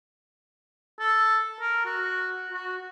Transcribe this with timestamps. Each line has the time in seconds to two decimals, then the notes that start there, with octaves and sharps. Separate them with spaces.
1.00 A4
1.61 A#4
1.86 F#4
2.52 F#4